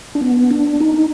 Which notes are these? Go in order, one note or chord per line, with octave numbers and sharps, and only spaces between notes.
D4
B3
D4
D#4